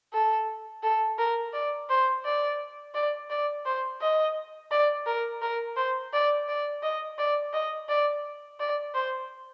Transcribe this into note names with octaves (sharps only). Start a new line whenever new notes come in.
A4
A4
A#4
D5
C5
D5
D5
D5
C5
D#5
D5
A#4
A#4
C5
D5
D5
D#5
D5
D#5
D5
D5
C5